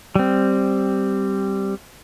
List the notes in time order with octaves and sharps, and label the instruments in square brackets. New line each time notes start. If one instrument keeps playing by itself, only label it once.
[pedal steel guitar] G3 C4